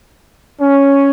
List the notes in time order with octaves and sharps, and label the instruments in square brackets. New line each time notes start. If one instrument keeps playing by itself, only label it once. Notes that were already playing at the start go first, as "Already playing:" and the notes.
[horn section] C#4